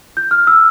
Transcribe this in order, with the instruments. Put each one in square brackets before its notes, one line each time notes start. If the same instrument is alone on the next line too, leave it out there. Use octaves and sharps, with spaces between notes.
[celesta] G6
F6
E6